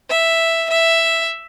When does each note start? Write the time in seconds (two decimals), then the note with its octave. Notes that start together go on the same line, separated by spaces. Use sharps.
0.10 E5
0.70 E5